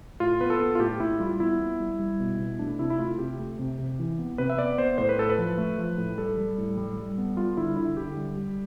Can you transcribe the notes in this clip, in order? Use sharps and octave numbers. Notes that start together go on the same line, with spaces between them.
A2 F4
B3 B4
A4
B3
F4
A2 G4
A2 E4
G3 F4
B3 E4
B3
G3
G3
B2
B2
A3 D4
C3 E4
E4
A3 F4
C3 G4
A3
C3
C3
E3
B3
C3 B4
E5
B3 D5
B3 C5
A2 C5
B4
A2 A4
B4
F3
A3
F3
A2
G3 A4
G3
A2
G3
G3
B3
G3 F4
D3 E4
D3 E4
D3 G4
G3
G3